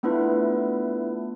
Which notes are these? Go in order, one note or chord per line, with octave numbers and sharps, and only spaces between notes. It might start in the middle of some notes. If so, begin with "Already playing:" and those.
A3 B3 D4 E4 F4 B4